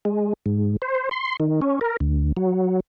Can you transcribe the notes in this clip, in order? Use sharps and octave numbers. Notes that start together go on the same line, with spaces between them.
G#3
G#2
C5
C6
D#3
C#4
A#4
D2
F#3